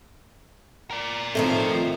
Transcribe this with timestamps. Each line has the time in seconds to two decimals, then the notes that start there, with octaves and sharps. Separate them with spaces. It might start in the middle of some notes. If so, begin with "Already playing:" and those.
0.91 A#4 D5
1.35 A2 D#3 F3 A3 C4 C5